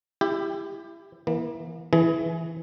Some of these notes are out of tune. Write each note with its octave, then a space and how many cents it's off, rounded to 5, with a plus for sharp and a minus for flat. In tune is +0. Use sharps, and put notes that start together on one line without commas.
E4 +20 G4 +15
E3 +0 A#3 +40
E3 +0 G#4 +25